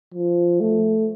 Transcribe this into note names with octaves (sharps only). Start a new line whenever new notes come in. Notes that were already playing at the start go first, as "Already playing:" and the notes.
F3
A3